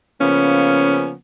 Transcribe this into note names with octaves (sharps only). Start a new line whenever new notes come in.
C#3 F3 A#3 B3 C#4